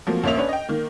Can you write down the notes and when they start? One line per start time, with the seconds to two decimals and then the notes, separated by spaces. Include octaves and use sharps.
0.07 F3 F#3 A3 A#3 C4
0.24 A1 D2 A#3 C#5 E5 F7
0.37 C#4 D4 B4 C#5
0.49 D#5 G5
0.69 D#3 A#3